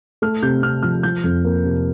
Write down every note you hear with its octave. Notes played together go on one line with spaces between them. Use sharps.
A3 F6
C3 G6
C3 F6
F3 F6
F3 G6
F2
A#3
C3